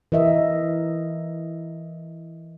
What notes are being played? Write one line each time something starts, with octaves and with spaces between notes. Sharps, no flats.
E3 A#4 D#5 E5